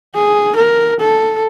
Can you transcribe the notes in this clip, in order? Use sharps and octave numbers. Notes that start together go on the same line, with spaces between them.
G#4
A#4
A4